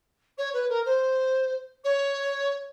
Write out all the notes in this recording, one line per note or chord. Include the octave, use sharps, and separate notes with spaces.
C#5
B4
A#4
C5
C#5